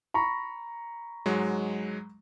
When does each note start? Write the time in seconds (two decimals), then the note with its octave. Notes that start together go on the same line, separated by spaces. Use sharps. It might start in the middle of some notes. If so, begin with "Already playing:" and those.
0.14 A#5 B5 C#6
1.26 G#2 F#3 G#3